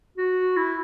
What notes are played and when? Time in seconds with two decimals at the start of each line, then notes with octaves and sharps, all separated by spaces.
0.17 F#4
0.57 E4